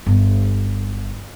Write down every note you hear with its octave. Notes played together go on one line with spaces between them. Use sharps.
G1